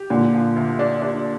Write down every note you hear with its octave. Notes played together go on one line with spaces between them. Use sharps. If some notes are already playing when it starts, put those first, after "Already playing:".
Already playing: G4
A#2 D3
F3
D2
D4
D4